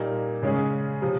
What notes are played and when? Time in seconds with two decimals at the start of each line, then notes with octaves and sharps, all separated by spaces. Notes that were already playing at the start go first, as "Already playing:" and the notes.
Already playing: A#2 G3 A#3 D#4
0.42 C#3 G#3 C#4 G#4
1.02 C3 F3